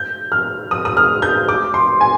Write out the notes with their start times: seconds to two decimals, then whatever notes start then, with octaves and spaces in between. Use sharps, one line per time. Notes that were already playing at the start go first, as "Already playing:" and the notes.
Already playing: G6
0.32 F6
0.71 D#6
0.85 D#6
0.97 F6
1.22 G6
1.48 D6
1.74 C6
2.01 G#5